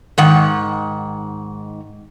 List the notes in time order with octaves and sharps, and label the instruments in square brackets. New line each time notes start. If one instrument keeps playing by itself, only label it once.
[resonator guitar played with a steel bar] G#2 D#3 F#5